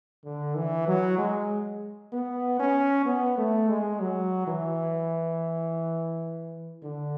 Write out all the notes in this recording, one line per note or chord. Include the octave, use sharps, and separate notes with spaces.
D3
E3
F#3
G#3
B3
C#4
B3
A3
G#3
F#3
E3
D3